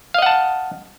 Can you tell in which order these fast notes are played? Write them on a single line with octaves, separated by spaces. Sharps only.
F5 D#5 F#5 A5